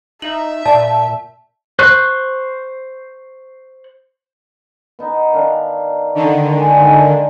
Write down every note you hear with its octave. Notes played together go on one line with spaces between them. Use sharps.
D#4 E5 F#7
A#2 D5 A5
C5 C#6 F#6
B3 D#4
D#3 D4 F5
D3 D#3 D5 E5 C#6
G#3 D4
G#3 F5